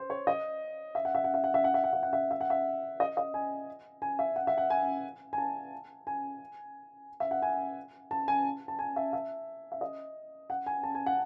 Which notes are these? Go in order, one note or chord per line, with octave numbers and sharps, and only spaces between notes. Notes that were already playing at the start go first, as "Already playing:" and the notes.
Already playing: C5
C#5
D#5
E5
F#5
E5
F#5
E5
F#5
E5
F#5
E5
F#5
E5
F#5
E5
E5
F#5
E5
D#5
D#5
G#5
G#5
E5
F#5
E5
F#5
G#5
G#5
A5
G#5
E5
F#5
G#5
A5
G#5
A5
G#5
E5
E5
E5
D#5
F#5
G#5
A5
G#5
F#5